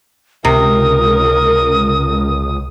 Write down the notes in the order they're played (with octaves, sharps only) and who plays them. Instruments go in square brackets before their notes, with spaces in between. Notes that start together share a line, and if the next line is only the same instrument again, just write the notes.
[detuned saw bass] C#2 [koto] C3 [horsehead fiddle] A#4 [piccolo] D#6